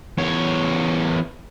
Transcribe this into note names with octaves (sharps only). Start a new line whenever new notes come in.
E2 C#5